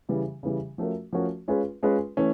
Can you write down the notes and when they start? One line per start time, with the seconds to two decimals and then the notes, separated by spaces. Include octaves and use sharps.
0.09 C#3 E3 G3
0.43 C#3 E3 G3
0.78 F3 A3 C#4 F#4 A#4
1.13 F3 A3 C#4 F#4 A#4
1.48 G#3 C#4 F4 G#4 B4
1.83 G#3 C#4 F4 G#4 B4
2.17 E3 A3 C#4